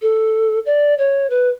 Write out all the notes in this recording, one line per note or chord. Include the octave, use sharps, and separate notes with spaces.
A4
D5
C#5
B4